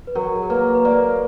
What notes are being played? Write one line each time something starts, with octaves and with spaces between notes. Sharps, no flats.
B4
F#3 A#4
G#4
A#4
A#3 B4
B4
A#3 D5